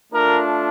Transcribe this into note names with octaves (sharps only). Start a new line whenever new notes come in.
A3 D4 F4 A#4